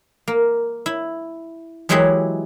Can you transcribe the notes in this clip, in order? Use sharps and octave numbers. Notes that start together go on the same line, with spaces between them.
A#3
E4
E3 F#3 G#3 E4 G4 G#4